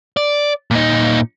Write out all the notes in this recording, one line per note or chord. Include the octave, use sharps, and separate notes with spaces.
D5
A#2 D#4